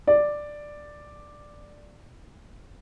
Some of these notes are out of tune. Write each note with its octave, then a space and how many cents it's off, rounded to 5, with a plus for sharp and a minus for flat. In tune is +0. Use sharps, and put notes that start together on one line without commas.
D5 +5